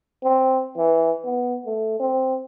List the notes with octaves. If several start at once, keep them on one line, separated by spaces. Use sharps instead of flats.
C4
E3
B3
A3
C4